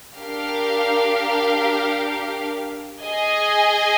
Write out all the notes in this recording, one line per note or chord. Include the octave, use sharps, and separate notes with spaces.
D4 G4 A#4 F5
G#4 D#5 G#5